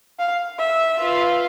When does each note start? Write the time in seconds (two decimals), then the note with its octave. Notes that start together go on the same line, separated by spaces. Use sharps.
0.19 F5
0.58 E5
0.98 F4 B4 F5